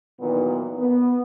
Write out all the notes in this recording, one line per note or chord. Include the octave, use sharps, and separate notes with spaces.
A#2 D#3 E3 F#3 B3
B3